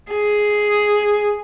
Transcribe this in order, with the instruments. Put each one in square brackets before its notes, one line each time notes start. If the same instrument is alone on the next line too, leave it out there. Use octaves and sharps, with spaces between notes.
[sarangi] G#4